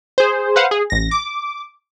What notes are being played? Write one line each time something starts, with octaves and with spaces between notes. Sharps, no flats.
G#4 C5
B4 C5 F5 F#5
G#4
A1 A#6
D6